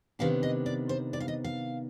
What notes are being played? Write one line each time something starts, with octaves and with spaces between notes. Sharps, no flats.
C3 D#3 B3 D4 F5
D#5
D5
C5
D5
F5
D#5
F5